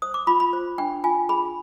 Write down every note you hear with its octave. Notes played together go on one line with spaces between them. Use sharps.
C5 D#6
D6
F4 B5
B5
C5
D4 G5
F4 G#5
G#4 B5